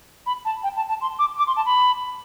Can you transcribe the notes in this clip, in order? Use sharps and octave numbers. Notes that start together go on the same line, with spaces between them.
B5
A5
G5
A5
A5
C6
D6
D6
C6
A5
B5